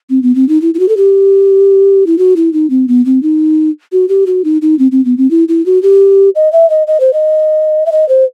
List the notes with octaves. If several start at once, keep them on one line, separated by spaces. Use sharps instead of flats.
C4
B3
C4
D#4
E4
E4
F#4
A4
G4
E4
F#4
E4
D#4
C4
B3
C4
D#4
F#4
G4
F#4
D#4
D#4
C4
C4
B3
C4
E4
E4
F#4
G4
D#5
E5
D#5
D#5
C5
D#5
E5
D#5
C5